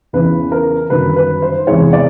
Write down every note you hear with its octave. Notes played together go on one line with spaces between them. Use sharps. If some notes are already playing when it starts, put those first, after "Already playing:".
E2 C#3 E3 B4
A#4
G1 F#2 D#3 F#3 B4
B4
C5
E2 C3 E3 G#3 C#5
D5